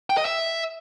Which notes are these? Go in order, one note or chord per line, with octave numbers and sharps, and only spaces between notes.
G5
D#5
E5